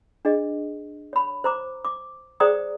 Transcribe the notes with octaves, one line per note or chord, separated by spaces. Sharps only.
D4 G#4 D#5
C#5 B5
C5 A#5 D6
D6
G#4 C5 D5 G5 A#5 D#6